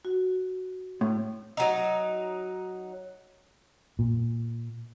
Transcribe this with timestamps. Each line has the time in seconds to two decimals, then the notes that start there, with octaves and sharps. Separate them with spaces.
0.05 F#4
1.01 A2
1.57 F#3 D#4
3.99 A#2